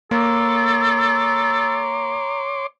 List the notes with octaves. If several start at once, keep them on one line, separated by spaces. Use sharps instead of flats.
A#3 A4 C#5 A#5 C6 D6